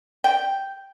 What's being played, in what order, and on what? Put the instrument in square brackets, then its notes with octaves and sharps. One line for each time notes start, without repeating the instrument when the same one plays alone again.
[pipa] G5